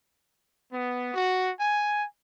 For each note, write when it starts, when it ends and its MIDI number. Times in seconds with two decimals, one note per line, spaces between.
0.73 1.11 59
1.14 1.51 66
1.60 2.04 80